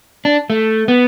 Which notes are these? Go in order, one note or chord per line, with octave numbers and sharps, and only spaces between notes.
D4
A3
B3